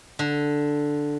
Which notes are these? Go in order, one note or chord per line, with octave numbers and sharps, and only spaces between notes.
D3